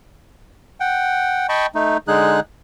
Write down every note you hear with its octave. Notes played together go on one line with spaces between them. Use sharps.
F#5 G5
D#5 G5 A5 B5 C#6
A3 D#4
D3 G#3 D#4 G#4 F#6